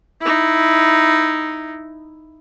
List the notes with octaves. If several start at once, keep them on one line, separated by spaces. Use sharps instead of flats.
D#4 E4